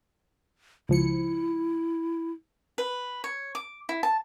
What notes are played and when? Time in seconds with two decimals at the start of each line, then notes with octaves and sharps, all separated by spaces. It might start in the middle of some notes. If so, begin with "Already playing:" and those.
0.89 C#2 F3 E4 C#7
2.78 B4
3.24 C#5
3.55 D6
3.89 E4
4.03 A5